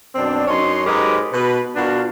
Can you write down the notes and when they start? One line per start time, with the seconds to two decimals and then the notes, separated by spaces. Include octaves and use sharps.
0.15 F#2 B2 C4 D4
0.48 F#2 D#4 C#5 D#5 C6
0.85 G#2 F#3 G4 A#4 B4 D#5
1.32 B2 B4
1.76 B2 B3 D4 F4 F#4 A#4